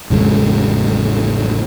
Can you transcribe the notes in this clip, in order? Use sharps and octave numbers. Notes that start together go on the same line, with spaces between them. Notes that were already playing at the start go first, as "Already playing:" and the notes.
A1 F2 C#3 G#3